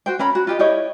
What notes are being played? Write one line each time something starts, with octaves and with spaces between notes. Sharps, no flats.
F#4 C5 G5
C#4 A#5 B5
F#4
F4 G4 D#5
E4 G4 C#5 D#5